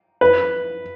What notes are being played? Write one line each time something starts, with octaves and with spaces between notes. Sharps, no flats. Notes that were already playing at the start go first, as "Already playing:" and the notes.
B4